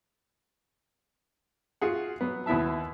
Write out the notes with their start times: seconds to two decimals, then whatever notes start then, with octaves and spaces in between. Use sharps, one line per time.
1.82 F4 F#4 G#4 F#5
2.21 F#3 B3
2.46 D#2 B3 E4 E5 A5